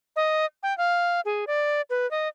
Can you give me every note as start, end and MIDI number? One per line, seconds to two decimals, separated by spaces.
0.16 0.45 75
0.63 0.76 79
0.78 1.21 77
1.25 1.45 68
1.47 1.82 74
1.90 2.09 71
2.11 2.28 75